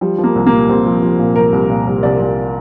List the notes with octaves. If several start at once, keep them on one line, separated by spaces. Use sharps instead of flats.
F3 G3
F3
A#3
C2
A#3
A#2
C2 C4
F3
F3
A#2
C2 A#4
C2
A#2
C2
C2 D5
C2